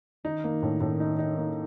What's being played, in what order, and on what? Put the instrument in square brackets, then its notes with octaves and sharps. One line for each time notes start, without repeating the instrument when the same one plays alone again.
[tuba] D#3 [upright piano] D#4
[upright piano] A#3
A2
A2
D#4
D#4
A#3